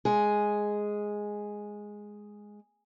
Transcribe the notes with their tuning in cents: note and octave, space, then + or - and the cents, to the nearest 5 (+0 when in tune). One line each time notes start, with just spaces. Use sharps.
G#3 +0 G#4 +0